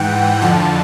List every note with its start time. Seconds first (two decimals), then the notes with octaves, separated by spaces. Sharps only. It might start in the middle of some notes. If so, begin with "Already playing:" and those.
Already playing: G#2 E3 F#5 G5
0.42 F2 D3 F3 A5